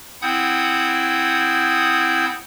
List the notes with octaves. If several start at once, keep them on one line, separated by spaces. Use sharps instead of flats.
C4 E4 F#5 D#6 G6 G#6